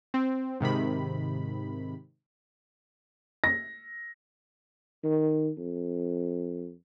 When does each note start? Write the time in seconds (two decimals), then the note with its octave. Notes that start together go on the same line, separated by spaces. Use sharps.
0.14 C4
0.60 G#2 C3 D#3 B5
3.44 A#6
5.04 D#3
5.58 F2